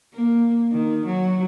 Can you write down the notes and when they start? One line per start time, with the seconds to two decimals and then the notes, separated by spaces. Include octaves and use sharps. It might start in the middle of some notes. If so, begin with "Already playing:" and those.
0.14 A#3
0.71 D#3
1.05 F#3